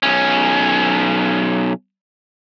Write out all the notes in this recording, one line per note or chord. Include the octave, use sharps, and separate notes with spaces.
B1 C#4